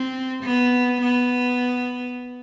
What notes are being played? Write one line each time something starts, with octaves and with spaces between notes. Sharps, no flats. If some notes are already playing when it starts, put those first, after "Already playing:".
Already playing: C4
B3
B3